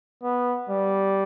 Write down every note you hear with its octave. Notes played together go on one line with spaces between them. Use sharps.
B3
G3